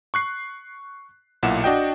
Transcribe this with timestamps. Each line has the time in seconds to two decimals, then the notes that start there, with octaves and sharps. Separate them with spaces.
0.14 C#6 F#6 C7
1.43 B1 A#2 E4 F#5 E7
1.64 D4 F#4 D#5 G5